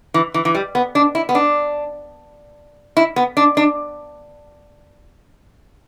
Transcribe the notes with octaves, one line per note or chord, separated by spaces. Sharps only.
E3
E3
E3
G3
B3
D4
E4
B3
D4
E4
B3
D4
D4